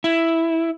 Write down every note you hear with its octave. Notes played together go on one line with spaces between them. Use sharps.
E4